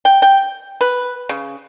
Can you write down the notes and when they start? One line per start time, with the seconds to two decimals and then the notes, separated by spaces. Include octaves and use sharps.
0.05 G5
0.22 G5
0.81 B4
1.29 C#3